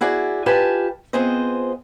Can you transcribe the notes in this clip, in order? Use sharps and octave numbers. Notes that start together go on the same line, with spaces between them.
E4 F#4 G#4 D5
F4 G4 B4 D5 G#5 A5
B3 C4 F4 G#4 C5 D#5